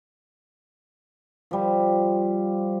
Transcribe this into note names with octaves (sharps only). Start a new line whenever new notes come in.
F3 G3